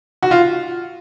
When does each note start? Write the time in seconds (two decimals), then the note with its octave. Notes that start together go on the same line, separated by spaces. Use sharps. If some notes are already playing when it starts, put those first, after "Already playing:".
0.23 F#4
0.31 F4